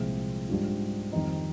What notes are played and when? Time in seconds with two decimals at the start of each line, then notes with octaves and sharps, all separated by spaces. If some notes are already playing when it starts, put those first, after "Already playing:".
Already playing: C2 A#2 F3 G#3 C4
0.49 G#2 G3 D4 F4
1.12 F2 D#3 G3 C4 D#4